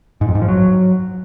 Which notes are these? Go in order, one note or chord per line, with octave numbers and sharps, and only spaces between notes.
G#2
F2
G#2
F3
F#3